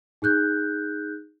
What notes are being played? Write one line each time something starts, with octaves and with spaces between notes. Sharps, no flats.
D#4 G#4 F#6 G6